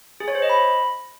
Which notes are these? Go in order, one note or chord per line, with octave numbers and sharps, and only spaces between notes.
G#4
C#5
C5
D#5
B5